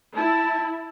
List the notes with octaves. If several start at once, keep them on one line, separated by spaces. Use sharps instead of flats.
E4 A5